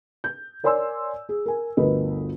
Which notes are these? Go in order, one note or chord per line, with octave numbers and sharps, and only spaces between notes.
G6
A#4 C#5 D5 G#5 C6 E6
G#4
A#4 G#5
G1 D2 A#4 B4 D#5